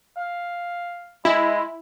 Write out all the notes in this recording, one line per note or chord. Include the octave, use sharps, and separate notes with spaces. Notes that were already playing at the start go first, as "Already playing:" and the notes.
F5
G#3 E4